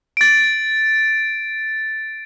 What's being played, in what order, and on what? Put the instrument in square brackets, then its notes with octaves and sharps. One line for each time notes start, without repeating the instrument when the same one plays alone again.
[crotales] A6 D7